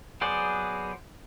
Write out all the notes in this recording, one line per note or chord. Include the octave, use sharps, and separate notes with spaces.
F#3 B3 G#4 C5 D5